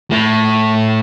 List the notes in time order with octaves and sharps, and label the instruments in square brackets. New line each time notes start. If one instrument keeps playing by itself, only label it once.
[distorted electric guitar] A2